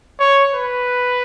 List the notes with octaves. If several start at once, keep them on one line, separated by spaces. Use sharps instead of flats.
C#5
B4